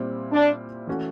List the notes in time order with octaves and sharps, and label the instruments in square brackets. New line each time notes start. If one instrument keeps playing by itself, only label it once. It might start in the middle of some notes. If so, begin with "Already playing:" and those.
Already playing: [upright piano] A#2 G3 C4 E4
[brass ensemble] D4
[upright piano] E3 A3 C#4 F#4